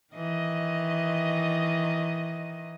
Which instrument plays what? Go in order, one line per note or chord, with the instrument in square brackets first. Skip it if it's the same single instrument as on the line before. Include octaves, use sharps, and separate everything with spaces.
[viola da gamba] D#3 E3 D#5